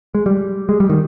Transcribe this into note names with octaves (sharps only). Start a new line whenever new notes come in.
G#3
G3
G#3
G3
D#3